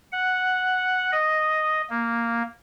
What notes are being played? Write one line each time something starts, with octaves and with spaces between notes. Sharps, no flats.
F#5
D#5
A#3